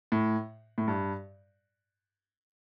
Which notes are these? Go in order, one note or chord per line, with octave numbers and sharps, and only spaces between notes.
A2
A2
G2